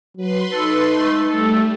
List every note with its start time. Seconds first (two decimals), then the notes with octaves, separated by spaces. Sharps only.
0.17 F#3 B4 C6
0.53 D#4 A4
0.95 G#3 A3
1.29 G3 A3 A4